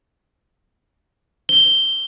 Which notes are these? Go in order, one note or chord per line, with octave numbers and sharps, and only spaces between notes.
G7